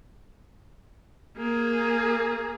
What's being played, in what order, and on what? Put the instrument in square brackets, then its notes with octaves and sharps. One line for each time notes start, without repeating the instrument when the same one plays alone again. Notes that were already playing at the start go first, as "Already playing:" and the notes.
[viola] A#3 G#4